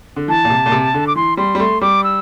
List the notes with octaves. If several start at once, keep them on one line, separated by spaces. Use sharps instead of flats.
D3
E3 A5
A#2
C3
A#2
C3
D3
D6
E3 C6
G3 C6
G3
A3 C6
G3 D6
E6